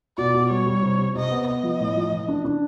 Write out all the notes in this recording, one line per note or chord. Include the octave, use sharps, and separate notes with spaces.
B2 D5
B2
G3 C#5
G3
C3
C3
C3 D#5
B3
B3 D#5
F3
A2
F3
E3
D4
D4